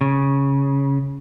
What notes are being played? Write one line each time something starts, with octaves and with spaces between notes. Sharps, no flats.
C#3